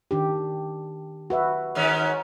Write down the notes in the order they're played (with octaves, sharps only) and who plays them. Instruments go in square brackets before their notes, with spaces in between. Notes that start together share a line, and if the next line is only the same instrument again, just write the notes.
[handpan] D#3 D4 G4
F#4 B4 E5
[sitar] G#2 D#3 C#4